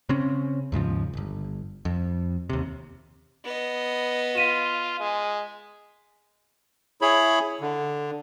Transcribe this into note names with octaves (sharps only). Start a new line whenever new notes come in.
C#3 C4 C#4
D#2 G#2 C#3 F3
D1 G1
F2
D#2 C3
B3 D#5
F4 B6 D#7 E7
G#3
E4 G#4 C#5 B5
D3